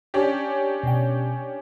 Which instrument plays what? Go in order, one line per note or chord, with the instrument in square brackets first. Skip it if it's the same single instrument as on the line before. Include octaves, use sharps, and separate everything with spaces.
[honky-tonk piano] C#4 D4 G4
[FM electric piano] B2 G5